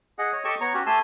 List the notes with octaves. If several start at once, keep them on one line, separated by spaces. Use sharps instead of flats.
G#4 D#5 F#5
C#5 D#5
G4 A4 D#5 G5 A5 C#6
B3 C#5 A#5 C#6
C#4 F#4 G4
A3 G4 G#5 A5 C6 E6